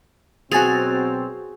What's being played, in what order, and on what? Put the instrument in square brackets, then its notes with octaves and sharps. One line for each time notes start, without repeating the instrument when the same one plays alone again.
[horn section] B2 F#3 C4 [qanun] F#4 G#4 [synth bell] G#5 A6 F7